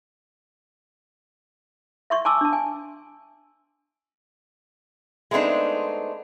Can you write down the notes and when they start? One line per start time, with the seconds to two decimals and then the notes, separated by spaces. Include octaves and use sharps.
2.10 E5 C6 C#6
2.25 G#5 A5 C6 D6 E6
2.41 D4 A5
2.53 G#5
5.31 G#3 A3 B3 C4 D4 D#4